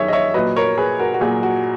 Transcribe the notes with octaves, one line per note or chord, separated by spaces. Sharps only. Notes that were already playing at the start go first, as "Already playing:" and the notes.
Already playing: F#2 D#3 G#4 C#5 E5
D#5
C#5 E5
A#2 F#3 B4 D#5
A#4 C#5
G#4 B4
F#4 A#4
F#4
A#2 F#3 G#4
F#4